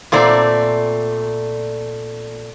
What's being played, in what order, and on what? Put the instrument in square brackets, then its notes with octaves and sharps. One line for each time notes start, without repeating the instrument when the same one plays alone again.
[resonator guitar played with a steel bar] A#2 A3 C4 D5 A#5